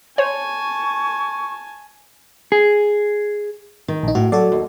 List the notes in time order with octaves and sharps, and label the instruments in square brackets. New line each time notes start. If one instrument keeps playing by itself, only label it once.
[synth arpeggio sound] C5 C#5 [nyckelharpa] G#5 A5 [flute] C#6
[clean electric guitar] G#4
[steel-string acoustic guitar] D#3
[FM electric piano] A#1 D#4
[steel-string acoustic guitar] A2 [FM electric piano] F#4
[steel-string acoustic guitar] F#3 [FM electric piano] F#4 A4 D5
[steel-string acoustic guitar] D#2